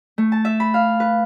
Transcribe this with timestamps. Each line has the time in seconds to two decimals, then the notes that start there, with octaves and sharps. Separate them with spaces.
0.18 A3
0.32 A5
0.45 E5
0.60 B5
0.74 F5
1.00 B4